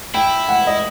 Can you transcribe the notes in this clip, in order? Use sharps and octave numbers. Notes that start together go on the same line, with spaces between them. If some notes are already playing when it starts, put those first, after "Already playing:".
E4 G5
F#5
D#5